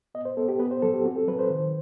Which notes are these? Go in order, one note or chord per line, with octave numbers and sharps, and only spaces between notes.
B3 D#5
C5
B3 A4
G4
B3 B4
C5
F#3 A4
G4
C4 F#4
A4
F#3 B4
C5
D#3